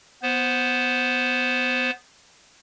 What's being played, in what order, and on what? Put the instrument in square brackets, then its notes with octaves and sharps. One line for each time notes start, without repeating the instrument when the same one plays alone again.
[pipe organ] B3 C5